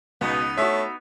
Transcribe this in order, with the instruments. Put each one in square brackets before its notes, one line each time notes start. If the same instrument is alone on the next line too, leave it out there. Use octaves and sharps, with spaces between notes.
[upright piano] C#2 [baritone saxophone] B2 [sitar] B3 D#4
[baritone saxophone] A3 [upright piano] F#4 E5 [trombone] C#5